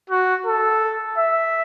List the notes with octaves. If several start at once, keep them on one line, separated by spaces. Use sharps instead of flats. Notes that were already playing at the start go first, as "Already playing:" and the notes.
F#4
A4
E5